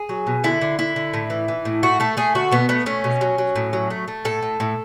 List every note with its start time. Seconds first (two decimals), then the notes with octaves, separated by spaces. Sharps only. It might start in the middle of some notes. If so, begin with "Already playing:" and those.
Already playing: G#4
0.09 F#3
0.27 B2
0.44 D3 E4
0.61 D3
0.79 D3 E4
0.96 D3
1.14 A2
1.30 E3
1.48 E3
1.65 A2
1.83 A3 F#4
2.00 A3 A4
2.17 A3 G#4
2.35 D3 F#4
2.51 B2 B3
2.69 A3 B3
2.86 A3 C#4
3.04 B2
3.21 F#3
3.38 F#3
3.56 A2
3.73 F#3
3.90 A3
4.08 A3
4.25 A2 A4
4.42 A2
4.60 A2